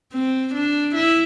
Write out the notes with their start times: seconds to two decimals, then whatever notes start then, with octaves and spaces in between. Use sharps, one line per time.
0.13 C4
0.54 D4
0.95 E4